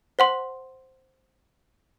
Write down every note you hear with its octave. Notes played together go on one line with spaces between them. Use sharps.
C5 F#5 C6